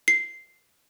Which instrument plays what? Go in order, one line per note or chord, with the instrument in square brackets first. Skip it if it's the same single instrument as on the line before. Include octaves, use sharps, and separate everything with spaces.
[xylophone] C7